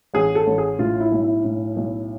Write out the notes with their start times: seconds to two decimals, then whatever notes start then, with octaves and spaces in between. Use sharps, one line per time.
0.14 A1 G#4
0.35 A4
0.47 A1
0.58 G#4
0.79 A2 F4
1.00 E4
1.12 B1
1.23 E4
1.44 A2
1.76 B1